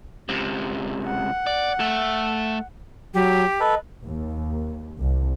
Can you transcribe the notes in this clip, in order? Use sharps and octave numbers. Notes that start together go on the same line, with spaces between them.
C#2 C3
F#5
D5
A3 E5
F#3 G4
A4 B4 D#5
D#2
C2